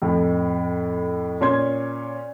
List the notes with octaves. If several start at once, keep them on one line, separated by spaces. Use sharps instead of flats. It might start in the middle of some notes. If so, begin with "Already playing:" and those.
F2 A2
A#2 C#4 C6 G#6